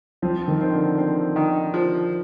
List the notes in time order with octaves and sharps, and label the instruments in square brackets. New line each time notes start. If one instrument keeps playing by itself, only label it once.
[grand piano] F3 [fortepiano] C4
[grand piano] D#3
[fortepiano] C4
[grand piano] D3
[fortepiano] C4
D#3
F3